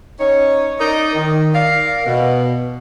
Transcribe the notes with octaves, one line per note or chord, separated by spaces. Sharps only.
C#4 D#4 C#5
D#4 A#4 D5 D#5
D#3
A#4 D5 F5
B2